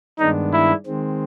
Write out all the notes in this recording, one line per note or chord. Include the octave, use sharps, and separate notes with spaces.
G2 D#3 G#3 B3 D4 D#4
E4
D#3 G#3 C4